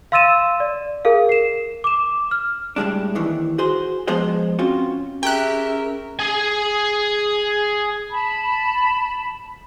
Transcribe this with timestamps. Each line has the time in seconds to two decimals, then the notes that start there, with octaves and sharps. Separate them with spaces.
0.12 F5 C6 E6 A6 D#7 E7
0.60 D5
1.05 G#4 A#4 F5
1.29 C7 E7
1.84 D6 E7
2.31 F6
2.76 A2 G3 G#3 D4
3.15 D#2 D#3 E3
3.58 F#4 G#4 C5
4.07 F3 G#3 B3 G#4 C5 D#5
4.59 C4 C#4 F4 F#4
5.23 C#4 G4 G#4 A#4 E5 G5 F#6
6.19 G#4 G#5
8.10 A5 B5